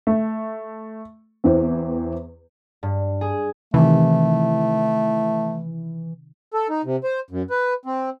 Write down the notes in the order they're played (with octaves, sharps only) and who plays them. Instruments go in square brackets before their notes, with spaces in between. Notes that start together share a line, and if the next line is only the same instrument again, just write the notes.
[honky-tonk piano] A3
E2 E3 C4
[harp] G2
G#4
[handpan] C3 D#3 [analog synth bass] E3 [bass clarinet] A3
[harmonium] A4
D#4
C3
C5
F#2
B4
C4